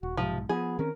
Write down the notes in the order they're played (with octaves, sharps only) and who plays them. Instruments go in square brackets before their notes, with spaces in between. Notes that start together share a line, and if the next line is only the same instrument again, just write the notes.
[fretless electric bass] D#1 [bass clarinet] F#4
[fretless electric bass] B1 G#2 [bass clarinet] C3 [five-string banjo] F3
[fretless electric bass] F3 [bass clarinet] B3 [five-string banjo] G#4
[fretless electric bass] D#3 C4 C#4 [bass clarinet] A#4